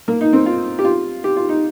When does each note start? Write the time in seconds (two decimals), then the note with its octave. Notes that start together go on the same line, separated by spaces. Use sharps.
0.08 A#3
0.21 D#4
0.33 C4
0.46 F4
0.79 G4
0.85 F4
1.24 G4
1.37 F4
1.49 D#4